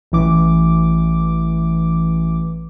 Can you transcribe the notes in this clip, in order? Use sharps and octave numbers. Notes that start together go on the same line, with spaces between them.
A1 E3 D6